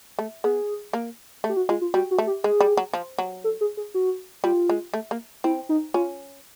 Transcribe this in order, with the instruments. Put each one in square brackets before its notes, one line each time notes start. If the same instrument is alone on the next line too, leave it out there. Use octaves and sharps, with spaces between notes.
[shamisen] A3
[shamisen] B3 [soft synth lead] G#4
[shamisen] A#3
A3
[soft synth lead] G4
F#4
[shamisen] G#3 [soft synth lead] F4
[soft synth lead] F4
[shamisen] G3 [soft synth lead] F#4
[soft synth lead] F#4
[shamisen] A3
[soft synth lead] G4
[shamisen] G#3 [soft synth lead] G#4
[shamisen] G3
F#3
F3
F#3
[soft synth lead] A4
G#4
G#4
F#4
[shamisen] G3 [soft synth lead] F4
[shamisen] G#3
A3
A#3
[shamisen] C4 [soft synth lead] E4
[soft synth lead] D#4
[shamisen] C#4 [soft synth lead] F4